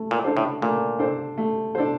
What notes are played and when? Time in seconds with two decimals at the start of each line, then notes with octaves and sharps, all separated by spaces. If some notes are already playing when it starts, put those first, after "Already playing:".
Already playing: A3
0.11 A#2
0.24 D4 A4 C5
0.37 A2
0.62 A#2 A3
0.99 D4 A4 C5
1.38 A3
1.75 D4 A4 C5